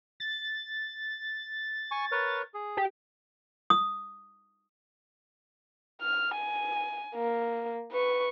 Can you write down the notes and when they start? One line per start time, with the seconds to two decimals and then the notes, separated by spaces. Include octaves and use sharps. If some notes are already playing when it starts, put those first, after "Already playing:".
0.20 A6
1.91 G#5 C#6
2.12 A#4 B4 C#5
2.54 G#4
2.77 G4
3.70 D#6
6.02 F6
6.35 G#5
7.15 A#3
7.92 B4 C#6